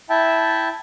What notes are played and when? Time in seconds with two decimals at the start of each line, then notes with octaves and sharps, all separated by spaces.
0.10 E4 E5 G5 A5